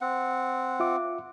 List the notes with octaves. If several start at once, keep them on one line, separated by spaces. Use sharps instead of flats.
C4 F#5
F4 E5 D6